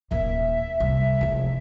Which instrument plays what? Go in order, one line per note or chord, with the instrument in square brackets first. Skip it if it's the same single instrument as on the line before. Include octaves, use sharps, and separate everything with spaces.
[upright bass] D#1 A#3 [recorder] E5
[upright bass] C2
F1 G#3